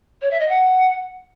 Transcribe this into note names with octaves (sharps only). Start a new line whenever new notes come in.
C#5
E5
D#5
F#5